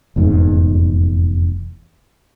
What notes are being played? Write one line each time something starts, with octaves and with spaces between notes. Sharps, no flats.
F1 E2 G#2